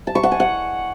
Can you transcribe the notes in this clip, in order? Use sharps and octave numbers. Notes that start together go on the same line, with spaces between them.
A5
C#6
F#5
G#5
F#5